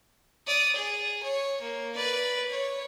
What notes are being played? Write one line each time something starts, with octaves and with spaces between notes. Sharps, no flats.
D5 D#6
G#4
C#5
A#3
B4 D5
C#5